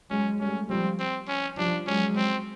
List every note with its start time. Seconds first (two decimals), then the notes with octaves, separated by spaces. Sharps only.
0.10 F#3 G#3 C#4
0.39 G3 A3 C#4
0.69 F3 G3 C4
0.99 C4
1.28 C#4
1.57 F3 G3 D4
1.86 F#3 G#3 C#4
2.16 C4